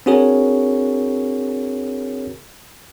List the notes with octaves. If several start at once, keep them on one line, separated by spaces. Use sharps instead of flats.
C4 D4 F#4 G#4 A#4 C#5